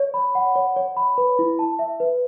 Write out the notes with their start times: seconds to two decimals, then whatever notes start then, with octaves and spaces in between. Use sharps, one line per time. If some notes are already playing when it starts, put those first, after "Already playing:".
Already playing: C#5
0.14 B5
0.35 F#5
0.56 C#5
0.76 C#5
0.97 B5
1.18 B4
1.39 E4
1.59 A5
1.79 E5
2.00 B4